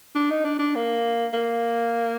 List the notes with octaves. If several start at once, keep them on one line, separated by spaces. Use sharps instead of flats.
D4
D#4
D4
D4
A#3
A#3